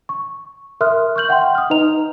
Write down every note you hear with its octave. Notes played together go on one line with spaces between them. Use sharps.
C#6
A#4 E5 C6 D#6 F6 F#6
C#6 F6 G6 F#7
E5 F#5 G5 C6
D#6 F6
D#4 B4 D#5 A#5 F7